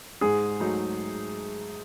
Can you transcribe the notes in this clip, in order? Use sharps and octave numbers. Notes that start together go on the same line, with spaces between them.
G#2 G#4
F#3 A3 D#4